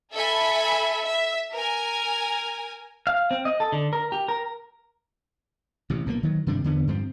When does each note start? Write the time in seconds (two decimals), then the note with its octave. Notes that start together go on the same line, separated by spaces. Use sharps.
0.14 A4 E5 G#5 B5
1.05 E5
1.53 A#4 G#5
3.07 F5
3.31 C4
3.45 D#5
3.60 A4
3.72 D3
3.93 A#4
4.12 G4
4.28 A#4
5.90 A1 C3
6.06 A#1 B2 E3 A#3
6.23 D#3 F#3
6.47 G2 C3 D#3 D4
6.64 E2 D3 B3
6.87 G2 F3 C4